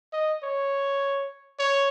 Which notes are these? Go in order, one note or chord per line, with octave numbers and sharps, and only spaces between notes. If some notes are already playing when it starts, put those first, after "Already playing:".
D#5
C#5
C#5